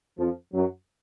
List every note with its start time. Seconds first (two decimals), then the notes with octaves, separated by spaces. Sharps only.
0.17 F2 F3
0.53 F#2 F#3